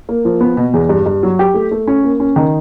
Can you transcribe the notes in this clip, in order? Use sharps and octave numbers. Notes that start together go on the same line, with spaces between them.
A#3
F3
B3
B2
E2
G2
G2
F#3
G4
A3
A3
C#4
A#3
C#4
D#3